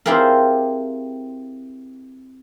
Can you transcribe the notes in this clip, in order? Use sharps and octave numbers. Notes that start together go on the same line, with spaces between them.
C4 E4 F4 G4 G#4 A#4